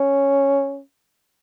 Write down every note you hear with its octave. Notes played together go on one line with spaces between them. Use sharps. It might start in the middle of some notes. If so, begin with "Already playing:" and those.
Already playing: C#4